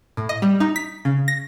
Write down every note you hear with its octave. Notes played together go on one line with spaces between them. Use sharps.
A2
D#5
G3
D#4
B6
C#3
A#6